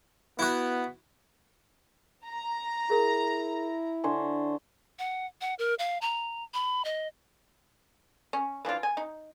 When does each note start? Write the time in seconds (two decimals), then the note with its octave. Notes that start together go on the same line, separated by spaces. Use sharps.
0.39 B3 E4 F#4
2.27 A#5
2.90 E4 G#4 A#4
4.04 D3 C5 C#5 G#5
4.99 F#5
5.41 F#5
5.59 A#4
5.79 F5
6.01 A#5
6.54 B5
6.85 D#5
8.33 C#4
8.65 E3 F3 D4 F4
8.83 G#5
8.97 D#4